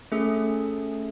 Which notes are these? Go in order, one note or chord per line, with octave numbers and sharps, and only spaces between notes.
A3 C#4 G#4 A4